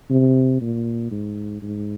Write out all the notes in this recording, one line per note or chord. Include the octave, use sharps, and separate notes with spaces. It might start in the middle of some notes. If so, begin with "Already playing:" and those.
C3
A#2
G#2
G#2